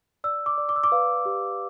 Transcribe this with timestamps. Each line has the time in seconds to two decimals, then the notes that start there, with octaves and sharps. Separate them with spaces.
0.24 D5 E6
0.46 D6
0.58 D5
0.69 D6
0.76 E6
0.84 D6
0.92 B4 F5
1.26 G4